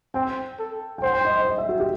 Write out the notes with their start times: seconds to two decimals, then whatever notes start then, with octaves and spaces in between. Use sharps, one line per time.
0.14 C4 G5
0.59 A4
0.98 G5
1.03 C5 F#5
1.13 G5
1.25 D#5
1.36 D#5
1.47 D#5
1.58 E5
1.69 F#4
1.80 G4